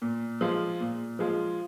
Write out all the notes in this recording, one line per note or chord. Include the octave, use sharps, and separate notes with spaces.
A#2
F3 G#3 F4
A#2
F3 G#3 F4